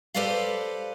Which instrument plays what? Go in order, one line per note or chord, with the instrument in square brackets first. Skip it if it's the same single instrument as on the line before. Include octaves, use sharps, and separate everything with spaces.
[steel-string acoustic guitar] G4 A4 B4 C5 D5 F5